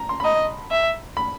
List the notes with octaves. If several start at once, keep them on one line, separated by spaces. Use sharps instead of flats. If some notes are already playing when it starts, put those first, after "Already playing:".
Already playing: A#5
C6
B5
D#5 A#5
E5
B5